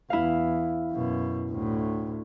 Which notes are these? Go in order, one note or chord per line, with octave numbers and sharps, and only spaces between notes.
E2 E4 F5
F#2 B2
D2 A2